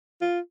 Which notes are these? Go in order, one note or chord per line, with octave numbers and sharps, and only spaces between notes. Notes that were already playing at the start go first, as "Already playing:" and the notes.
F4